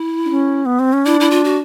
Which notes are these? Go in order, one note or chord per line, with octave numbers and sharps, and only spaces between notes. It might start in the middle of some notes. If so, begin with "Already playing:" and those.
Already playing: E4
D4
C#4
B3
C4
C#4
D4 E4
E4
F4
F#4